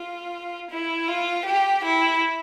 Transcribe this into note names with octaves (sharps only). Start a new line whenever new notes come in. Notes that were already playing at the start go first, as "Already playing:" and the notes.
Already playing: F4
E4
F4
G4
E4